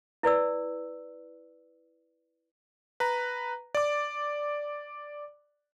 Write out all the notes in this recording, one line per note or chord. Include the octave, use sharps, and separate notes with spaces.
E4 B4 D5 E6
B4 A#5
D5 D6